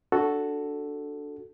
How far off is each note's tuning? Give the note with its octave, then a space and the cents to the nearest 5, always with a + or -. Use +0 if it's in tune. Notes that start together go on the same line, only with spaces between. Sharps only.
D4 +0 F#4 +0 A4 +0